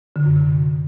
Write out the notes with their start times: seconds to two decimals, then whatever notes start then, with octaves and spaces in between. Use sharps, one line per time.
0.16 D3
0.26 F#2
0.36 C3